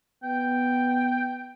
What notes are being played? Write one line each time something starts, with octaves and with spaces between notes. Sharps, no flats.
B3 G5